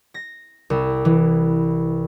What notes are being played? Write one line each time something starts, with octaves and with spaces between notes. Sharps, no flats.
A#6
C2
E3